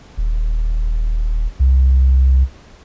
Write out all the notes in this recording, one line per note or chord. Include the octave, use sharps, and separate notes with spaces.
D#1
C2